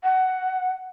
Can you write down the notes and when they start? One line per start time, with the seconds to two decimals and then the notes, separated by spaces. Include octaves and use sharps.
0.03 F#5